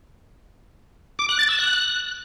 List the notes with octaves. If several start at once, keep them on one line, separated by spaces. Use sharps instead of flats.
D6
F#6
A6
E6
F#6